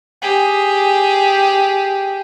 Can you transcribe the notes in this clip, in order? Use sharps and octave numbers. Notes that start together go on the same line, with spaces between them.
G4 G#4